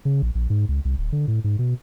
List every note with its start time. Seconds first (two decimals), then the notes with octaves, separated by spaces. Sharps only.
0.05 C#3
0.22 A#1
0.35 A#1
0.50 G#2
0.69 C#2
0.85 C2
0.98 D1
1.12 D3
1.28 A2
1.44 G#2
1.59 B2